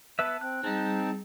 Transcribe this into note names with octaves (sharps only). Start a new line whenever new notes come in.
B3 B4 E5 A5
C4 F#6
G3 C4 D#4 G#4 A5